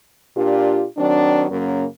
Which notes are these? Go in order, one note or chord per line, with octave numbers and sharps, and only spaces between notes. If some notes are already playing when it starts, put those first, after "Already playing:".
A#2 D4 F4 G4
D#3 F#3 C4 D4
F#2 C#3 F#3 A#3 C#4